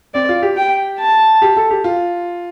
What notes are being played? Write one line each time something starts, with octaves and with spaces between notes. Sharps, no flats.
C4 D5
F4
G4
G5
A5
G4
A4
G4
F4